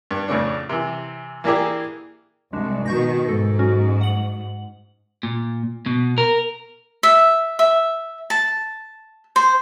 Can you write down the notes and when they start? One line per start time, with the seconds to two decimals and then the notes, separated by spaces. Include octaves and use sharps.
0.11 G2
0.28 F2 A2 C#3 D4
0.69 C3 E3
1.44 E3 A#3 D4 E4 G4 G#4
2.53 C2 G#3 D4
2.86 B2 D#3 C#6 G6 A#6
3.28 G#2 A4
3.59 F#3 C#4 F#4
4.01 F#5 F#7
5.23 A#2
5.86 B2
6.18 A#4
7.03 E5
7.59 E5
8.30 A5
9.36 C5